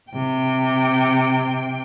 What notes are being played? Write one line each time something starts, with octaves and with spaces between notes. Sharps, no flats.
C3 G5